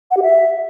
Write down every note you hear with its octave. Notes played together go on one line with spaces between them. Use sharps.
F#5
G4
E5